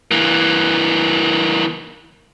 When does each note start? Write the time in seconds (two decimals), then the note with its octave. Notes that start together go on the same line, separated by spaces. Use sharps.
0.11 E3 A#3